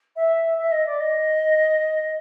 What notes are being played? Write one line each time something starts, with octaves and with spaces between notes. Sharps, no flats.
E5
E5
D#5
D5
D#5